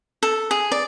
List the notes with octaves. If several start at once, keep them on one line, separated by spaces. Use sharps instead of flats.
A4
G#4
D5